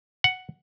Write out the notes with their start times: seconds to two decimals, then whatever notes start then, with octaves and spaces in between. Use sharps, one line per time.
0.24 F#5